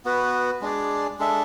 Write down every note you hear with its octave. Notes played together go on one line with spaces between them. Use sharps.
B3 F#4 B4
G#3 D4 G#4 D5
G#3 D4 A4 E5